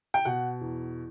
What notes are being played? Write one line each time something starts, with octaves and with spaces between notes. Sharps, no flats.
G5
B2 F#5
E2